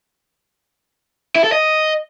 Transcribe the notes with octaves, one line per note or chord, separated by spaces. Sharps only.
E4
A4
D#5